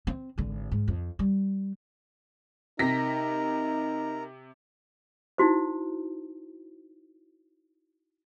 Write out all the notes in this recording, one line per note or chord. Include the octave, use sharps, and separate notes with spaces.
C4
G#1 D3
G#2
F2
G3
C3 D#4 A#4 A#6 B6
D#4 E4 F#4 C5